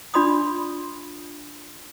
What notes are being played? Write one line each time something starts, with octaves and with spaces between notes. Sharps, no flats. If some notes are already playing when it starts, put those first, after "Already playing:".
D4 F4 D5 B5 C6 D#6